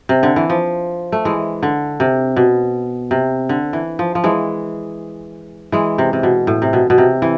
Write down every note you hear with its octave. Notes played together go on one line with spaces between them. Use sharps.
C3
D3
E3
F3
A3
E3 G#3
D3
C3
B2
C3
D3
E3
F3
F3
E3 G#3
E3 G#3
C3
C3
B2
A2
C3
B2
B2
C3
E3